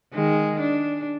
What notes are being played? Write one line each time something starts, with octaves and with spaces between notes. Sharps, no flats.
D#3 G#3
D4